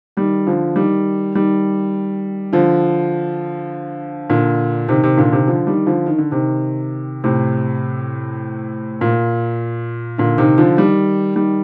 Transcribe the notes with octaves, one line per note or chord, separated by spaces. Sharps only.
D#3 G3
D3 F3
D#3 G3
D#3 G3
D3 F3
A#2 D3
C3 D#3
C3 D#3
A#2 D3
C3 D#3
D3 F3
D#3 G3
D3 F3
D#3
D3
C3 D#3
A2 C3
A#2
A#2 D3
C3 D#3
D3 F3
D#3 G3
D#3 G3